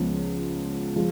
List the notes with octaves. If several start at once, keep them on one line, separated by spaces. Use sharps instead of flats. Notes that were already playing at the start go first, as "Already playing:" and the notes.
Already playing: C#2 C#3 F3 B3 F4
F3 G#3